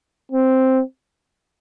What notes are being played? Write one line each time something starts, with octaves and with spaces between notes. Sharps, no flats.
C4